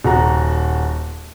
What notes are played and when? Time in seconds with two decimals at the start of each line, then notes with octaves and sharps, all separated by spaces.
0.05 D#1 F#4 A#5